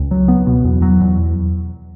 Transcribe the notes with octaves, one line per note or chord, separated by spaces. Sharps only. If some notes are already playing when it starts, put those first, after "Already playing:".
Already playing: C#2
F#3
B3
B2
E2
F#3
E2